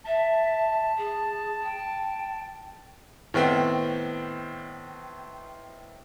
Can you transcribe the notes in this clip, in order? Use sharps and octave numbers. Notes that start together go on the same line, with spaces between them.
E5 A5
G#4
G5
A2 D#3 B3 C4